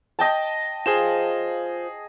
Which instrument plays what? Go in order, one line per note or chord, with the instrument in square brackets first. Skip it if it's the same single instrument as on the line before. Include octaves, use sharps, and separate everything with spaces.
[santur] D#5 G5 A5
[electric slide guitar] F4 C5 [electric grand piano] G#4 E7